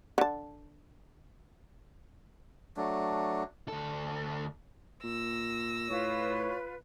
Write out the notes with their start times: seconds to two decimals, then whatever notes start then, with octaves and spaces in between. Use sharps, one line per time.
0.18 D3 A5
2.77 F#3 A3 D4
3.68 D2 A4
5.04 A#2 E6 A#6
5.90 A2 F4 B4 C#5